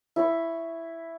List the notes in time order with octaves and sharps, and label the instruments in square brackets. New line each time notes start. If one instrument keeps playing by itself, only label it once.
[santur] E4 B5 C#6